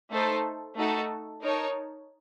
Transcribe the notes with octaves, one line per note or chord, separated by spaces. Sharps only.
A3 D#4 A4 C5
A3 D#4 F#4 A4
D#4 A#4 C#5 A5